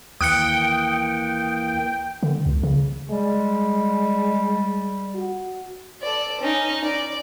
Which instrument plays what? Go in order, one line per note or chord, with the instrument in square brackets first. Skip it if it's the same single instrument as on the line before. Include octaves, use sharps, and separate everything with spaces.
[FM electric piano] D#2 [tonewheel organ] E3 A#3 [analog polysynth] G5 [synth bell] D#6 F#6 C#7
[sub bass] D3
C#2
C#3
[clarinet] G3 [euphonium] G#3
[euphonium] F#4
[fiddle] A4 D5
C#4 D#4
D5